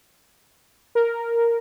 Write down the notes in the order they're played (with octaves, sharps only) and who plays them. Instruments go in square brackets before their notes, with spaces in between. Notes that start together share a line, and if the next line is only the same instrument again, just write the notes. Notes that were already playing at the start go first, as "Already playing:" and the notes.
[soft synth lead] A#4